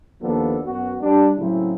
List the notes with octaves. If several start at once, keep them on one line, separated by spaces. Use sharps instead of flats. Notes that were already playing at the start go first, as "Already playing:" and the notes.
D#2 F3 A#3 B3 D4 A4
F#2 B3 F#4
G3 D4
A2 C#3 F#3 A3 C4 E4